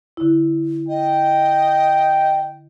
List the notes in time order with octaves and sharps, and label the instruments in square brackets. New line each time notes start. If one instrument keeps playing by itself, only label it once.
[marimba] D3 E4
[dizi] D#5 [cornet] G5